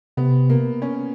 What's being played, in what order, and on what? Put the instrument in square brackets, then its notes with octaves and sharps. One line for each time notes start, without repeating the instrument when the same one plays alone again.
[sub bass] C3 [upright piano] B3
[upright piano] A#3
C#4